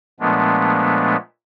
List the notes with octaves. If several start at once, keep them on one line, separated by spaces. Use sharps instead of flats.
A#2 F3 G#3 A3 B3 D4